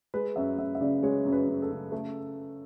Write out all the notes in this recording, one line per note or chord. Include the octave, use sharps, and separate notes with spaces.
G#3 B4
F#2 E5
F#2 E5
E5
C#3 D5
G#3 C#5
F#2
B4
F#2
A4
C#3
A3